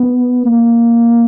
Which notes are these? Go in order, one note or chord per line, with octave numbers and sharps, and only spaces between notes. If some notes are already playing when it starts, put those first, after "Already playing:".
Already playing: B3
A#3